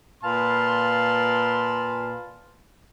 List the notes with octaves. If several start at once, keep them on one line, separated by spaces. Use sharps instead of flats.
A#2 B4 F5 A5 C6